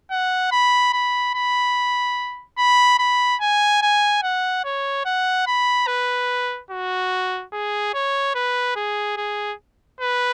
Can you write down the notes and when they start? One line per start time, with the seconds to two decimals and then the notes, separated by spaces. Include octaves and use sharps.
0.11 F#5
0.51 B5
0.93 B5
1.34 B5
2.58 B5
2.99 B5
3.41 G#5
3.82 G#5
4.23 F#5
4.64 C#5
5.05 F#5
5.47 B5
5.87 B4
6.71 F#4
7.53 G#4
7.94 C#5
8.35 B4
8.76 G#4
9.17 G#4
10.00 B4